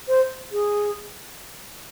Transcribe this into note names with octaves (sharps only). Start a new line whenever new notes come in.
C5
G#4